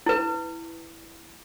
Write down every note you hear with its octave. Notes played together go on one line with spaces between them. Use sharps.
E4 B4